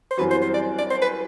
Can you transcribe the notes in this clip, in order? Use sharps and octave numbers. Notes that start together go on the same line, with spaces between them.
C5
F#2 E3 G3 C4 F#4 B4
C5
C5
D5
D5
C5
B4